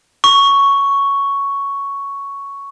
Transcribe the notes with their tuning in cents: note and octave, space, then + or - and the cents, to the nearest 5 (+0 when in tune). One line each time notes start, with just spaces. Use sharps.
C#6 +5